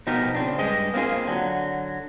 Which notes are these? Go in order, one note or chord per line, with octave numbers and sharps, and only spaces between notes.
B2 F3 D#4 G4 A#4
C#3 C4 D4
G2 G#3 G4 D#5
A#3 C4 C#4 F4 G#4
D3 F#3